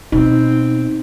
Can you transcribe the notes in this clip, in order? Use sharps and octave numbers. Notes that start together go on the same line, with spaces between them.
B2 C4 D#4